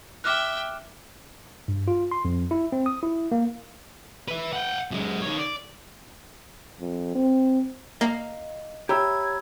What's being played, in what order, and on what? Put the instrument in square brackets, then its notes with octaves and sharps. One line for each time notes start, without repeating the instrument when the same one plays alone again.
[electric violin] E5 G5 [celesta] D6 F6 F#6
[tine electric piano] G2
F4
C6
F2
E4
C4
D#6
E4
A#3
[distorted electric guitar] B4 E5
F#5 G5
F#2 G#3
D#3 C#5
D5
[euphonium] F2
C4
[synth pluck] A#3 [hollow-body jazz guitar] D#5 F5 A#5
[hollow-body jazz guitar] G4 C#5 E5 [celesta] A#5 B5 E6 [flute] G#6